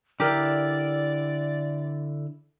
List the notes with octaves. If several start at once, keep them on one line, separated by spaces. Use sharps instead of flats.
D3 E4 G4 A#4 D5